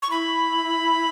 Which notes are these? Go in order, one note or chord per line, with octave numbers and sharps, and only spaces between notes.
C#6
E4 B5